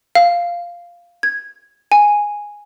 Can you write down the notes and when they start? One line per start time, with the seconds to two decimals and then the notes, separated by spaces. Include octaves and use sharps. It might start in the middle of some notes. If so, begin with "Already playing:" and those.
0.15 F5
1.23 G#6
1.92 G#5